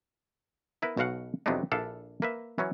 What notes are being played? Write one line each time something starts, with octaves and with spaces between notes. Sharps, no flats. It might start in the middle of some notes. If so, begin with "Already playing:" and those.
B3 E4 A#4 B4
B1 B2 F#4 F5 F#5
F2 C3 F#3 B3 D4 D#4
A#1 D4 E4 A4 F5
A#3 B4 E5
E3 F#3 C#4